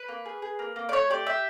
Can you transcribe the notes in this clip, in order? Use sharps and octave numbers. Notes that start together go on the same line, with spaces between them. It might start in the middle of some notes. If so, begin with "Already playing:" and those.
Already playing: B4
A#3
G#4
G#4
A#3
A#3
D5
A3 C#5
G4 D5
G4 E5